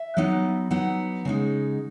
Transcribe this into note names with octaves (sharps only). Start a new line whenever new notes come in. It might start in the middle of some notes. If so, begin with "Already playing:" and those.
Already playing: E5
F#3 B3 D#4
F#3 B3 D#4 F#5
C#3 G#3 D#4